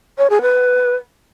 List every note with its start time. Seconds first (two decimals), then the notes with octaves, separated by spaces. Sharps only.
0.18 C#5
0.30 G#4
0.42 B4